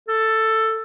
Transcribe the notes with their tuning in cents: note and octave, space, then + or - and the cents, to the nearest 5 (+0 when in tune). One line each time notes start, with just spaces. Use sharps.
A4 +10